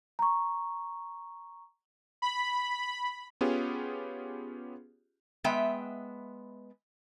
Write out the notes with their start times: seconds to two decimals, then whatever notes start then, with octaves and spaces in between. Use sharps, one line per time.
0.19 A#5 C#6
2.22 B5
3.41 B3 C#4 F4 G4 G#4
5.44 G#3 B3 E5 G5